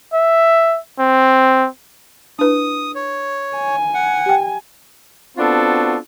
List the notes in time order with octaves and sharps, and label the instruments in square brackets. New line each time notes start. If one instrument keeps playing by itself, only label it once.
[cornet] E5
C4
[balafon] D4 E4 B4 [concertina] D#6
[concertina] C#5
[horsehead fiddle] G#5
[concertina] F#5
[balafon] G4 G5
[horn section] B3 C4 D4 F4 F#4 A4